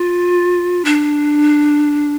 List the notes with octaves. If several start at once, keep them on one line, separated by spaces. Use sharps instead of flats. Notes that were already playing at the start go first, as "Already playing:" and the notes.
Already playing: F4
D4